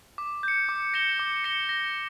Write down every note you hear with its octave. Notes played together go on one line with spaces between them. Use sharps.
D6
G6 C#7
D6
A#6 C#7 E7 G7
D6
A#6 C#7 E7 G7
A#6